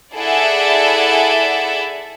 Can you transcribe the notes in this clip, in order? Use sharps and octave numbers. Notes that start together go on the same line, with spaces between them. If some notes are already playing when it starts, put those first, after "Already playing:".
E4 G#4 A4 D5 E5 F#5